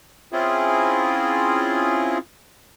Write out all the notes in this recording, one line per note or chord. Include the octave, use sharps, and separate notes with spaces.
C4 C#4 E4 F4 G#4